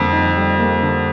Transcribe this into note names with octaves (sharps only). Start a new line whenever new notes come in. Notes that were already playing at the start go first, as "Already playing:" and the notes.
Already playing: F2 D3 G3 A#3
D#4
G3
A#3
D3